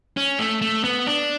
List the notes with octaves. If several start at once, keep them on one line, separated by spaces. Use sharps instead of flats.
C#4
A3
A3
B3
D4